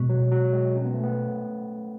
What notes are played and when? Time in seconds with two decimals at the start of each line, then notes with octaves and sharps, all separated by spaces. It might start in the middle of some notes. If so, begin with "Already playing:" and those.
Already playing: B2 G#3
0.09 F#3
0.32 F#3
0.53 G#3
0.76 C#4
0.84 B3
0.94 A3
1.03 B3